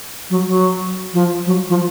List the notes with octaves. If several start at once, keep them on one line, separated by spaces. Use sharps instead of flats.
F#3
F#3
F3
F#3
F3